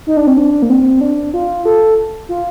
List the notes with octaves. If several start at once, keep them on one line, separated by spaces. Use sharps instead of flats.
D#4
D4
C4
D4
A#3
C4
D4
F4
A4
F4